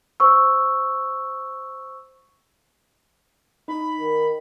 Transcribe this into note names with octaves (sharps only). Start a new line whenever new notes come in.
C5 C#6 E6
D#4 B5
D#3